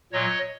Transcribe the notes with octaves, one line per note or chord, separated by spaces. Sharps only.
A#2 F#3 C#5 D#5